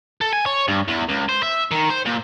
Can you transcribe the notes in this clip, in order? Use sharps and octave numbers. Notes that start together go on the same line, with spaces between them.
A4
G#5
C#5
G2
E2
C#2
C5
E5
D#3
C5
A#2